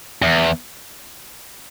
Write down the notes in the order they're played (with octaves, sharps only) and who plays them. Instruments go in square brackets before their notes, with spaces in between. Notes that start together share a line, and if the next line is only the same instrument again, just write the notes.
[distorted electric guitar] E2